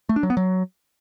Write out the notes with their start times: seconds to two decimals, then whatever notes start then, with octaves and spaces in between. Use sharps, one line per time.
0.09 A3
0.16 D4
0.23 F#3
0.30 B3
0.37 F#3